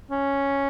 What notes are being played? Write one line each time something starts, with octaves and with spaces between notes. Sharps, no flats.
C#4